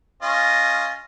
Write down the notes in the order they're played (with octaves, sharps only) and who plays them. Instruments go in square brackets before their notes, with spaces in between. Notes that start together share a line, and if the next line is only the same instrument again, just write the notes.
[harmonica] C#4 F4 D#5